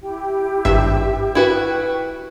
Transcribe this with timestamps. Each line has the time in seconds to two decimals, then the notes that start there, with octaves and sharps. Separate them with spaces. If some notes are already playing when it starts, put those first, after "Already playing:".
0.01 E4 G4 G5
0.65 G#1 G2 E5
1.35 E4 F#4 B4 G5 C#6